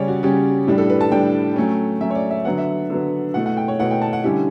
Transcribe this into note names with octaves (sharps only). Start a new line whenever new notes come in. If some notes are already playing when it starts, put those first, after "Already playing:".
Already playing: C#3 G3 C#4 C#5 D5
F#4
C#3 G3 C#4 G4
A2 G3 D4 G4
A4
B4
A5
A2 G3 D4 G5
F#3 A3 C#4
F#3 A3 C#4 E5
C#5
D5
E5
D3 F#3 B3 F#5
E5
D3 F#3 B3
B2 A3 E4 F#5
F#5
G5
C#5
B2 A3 E4 F#5
G5
A5
F#5
D3 G3 C#4 E4 G4